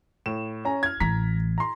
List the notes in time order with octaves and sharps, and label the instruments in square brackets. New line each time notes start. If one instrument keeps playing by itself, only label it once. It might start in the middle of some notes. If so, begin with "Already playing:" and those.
[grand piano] A2 E7
C#4 G#5 A#5
F6 G#6
[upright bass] A1 E3 [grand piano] A#5 B6
[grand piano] A#5 C6